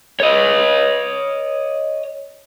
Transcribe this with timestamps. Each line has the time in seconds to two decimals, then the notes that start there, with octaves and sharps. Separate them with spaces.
0.20 C#5 D#5